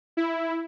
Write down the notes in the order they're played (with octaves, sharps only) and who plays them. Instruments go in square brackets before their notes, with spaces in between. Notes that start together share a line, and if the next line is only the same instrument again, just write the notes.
[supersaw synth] E4